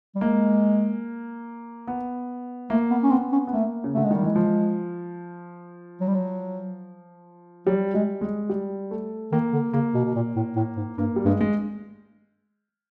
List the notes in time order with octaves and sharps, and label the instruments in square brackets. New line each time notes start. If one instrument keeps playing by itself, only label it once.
[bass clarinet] G3
[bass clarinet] G#3 [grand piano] A#3
[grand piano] B3
[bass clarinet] A3 [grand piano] A#3
[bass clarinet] B3
C#4
[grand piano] B3 [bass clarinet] C4
[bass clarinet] C#4
[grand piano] B3
[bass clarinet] A3 [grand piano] A#3
[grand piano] C#3
[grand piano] D3 [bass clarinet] A3
[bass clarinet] G#3
[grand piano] D#3 [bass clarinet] G3
[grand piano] E3 [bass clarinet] G#3
[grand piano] F3
[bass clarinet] F#3
G3
F#3
[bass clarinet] F#3 [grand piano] G3
[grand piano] G3 [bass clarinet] G#3
[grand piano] G#3
G3
A3
[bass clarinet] D#3 [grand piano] A#3
[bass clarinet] D3
[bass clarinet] C#3 [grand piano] A#3
[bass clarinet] B2
B2
A#2
A2
A2
G#2
[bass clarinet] G2 [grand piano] A#3
[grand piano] G3
[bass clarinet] G2 [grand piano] G#3
[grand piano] G#3